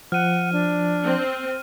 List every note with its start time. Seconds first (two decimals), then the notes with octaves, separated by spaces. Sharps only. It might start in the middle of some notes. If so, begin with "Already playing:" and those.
0.12 F3 F#5 F6 D#7
0.53 D4
1.04 C4